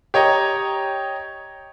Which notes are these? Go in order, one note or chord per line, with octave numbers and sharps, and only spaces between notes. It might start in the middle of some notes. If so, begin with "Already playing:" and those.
G4 C#5 D#5 A#5